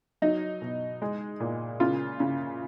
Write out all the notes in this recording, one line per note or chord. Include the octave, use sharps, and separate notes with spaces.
F#3 D#4
B2
G#3
A#2
C#3 F4
C#3